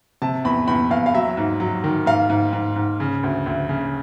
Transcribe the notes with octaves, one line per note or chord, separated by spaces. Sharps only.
C3 A5
E2 B5
E2 B5
E2 F5
F5
F#3 E5
G#2
F#3
D#3
G#2 F5
G#2
G#2
G#2
C#3
D2
D2
C#3